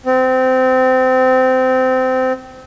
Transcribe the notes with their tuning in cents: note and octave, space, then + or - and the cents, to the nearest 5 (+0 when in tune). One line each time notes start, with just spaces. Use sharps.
C4 -20